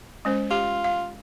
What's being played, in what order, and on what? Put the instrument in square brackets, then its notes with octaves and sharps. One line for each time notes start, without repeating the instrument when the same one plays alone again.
[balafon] G#3 C#4 C5
[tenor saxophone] F4 [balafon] G4
[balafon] F5